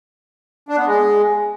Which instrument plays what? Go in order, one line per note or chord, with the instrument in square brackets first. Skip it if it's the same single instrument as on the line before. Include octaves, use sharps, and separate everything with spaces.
[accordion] D4
B3
G#3